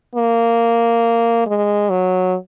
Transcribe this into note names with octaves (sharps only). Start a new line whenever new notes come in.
A#3
G#3
F#3